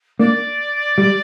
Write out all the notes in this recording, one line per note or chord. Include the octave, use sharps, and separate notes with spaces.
A#3 D4 D5
G3